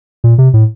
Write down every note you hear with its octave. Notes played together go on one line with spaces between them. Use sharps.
A#2
C3
A2